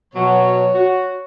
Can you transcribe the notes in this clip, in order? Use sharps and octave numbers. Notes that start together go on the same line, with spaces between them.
B2 F#3 C#5
F#4